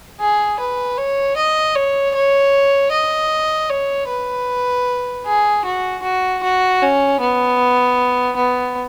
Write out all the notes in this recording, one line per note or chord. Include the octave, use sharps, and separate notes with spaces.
G#4
B4
C#5
D#5
C#5
C#5
D#5
C#5
B4
G#4
F#4
F#4
F#4
C#4
B3
B3